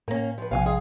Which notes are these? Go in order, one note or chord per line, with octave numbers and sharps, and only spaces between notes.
A2 A#3 C#4 A#4
F3 B4
A#1 C3 F3 F5 G#5
G#3 G#4 F5